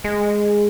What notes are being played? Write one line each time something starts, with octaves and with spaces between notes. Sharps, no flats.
G#3